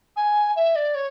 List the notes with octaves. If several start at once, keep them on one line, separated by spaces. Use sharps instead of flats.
G#5
E5
D5
C#5